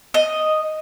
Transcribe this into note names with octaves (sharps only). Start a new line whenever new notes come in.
D#5